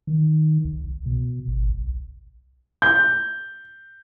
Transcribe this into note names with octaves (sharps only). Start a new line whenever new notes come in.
D#3
C2
C2
B2
G#1
B1
G6